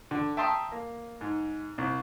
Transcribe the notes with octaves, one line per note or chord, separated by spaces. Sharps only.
D3
E5 G5 A5 A#5 C6 D#6
A#3
G#2
C2